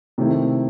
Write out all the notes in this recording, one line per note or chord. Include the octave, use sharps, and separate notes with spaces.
C3 D#3 A3 C4 E4